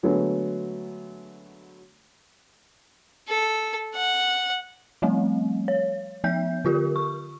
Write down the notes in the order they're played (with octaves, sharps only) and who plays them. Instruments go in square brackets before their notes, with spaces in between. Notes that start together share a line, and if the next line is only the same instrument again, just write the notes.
[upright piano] D3 F#3 G#3 A3 B3
[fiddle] A4
F#5
[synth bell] F3 G3 A3 C4
C#5
F3 B3 E5 G6
D3 F4 G4 A#4
C#6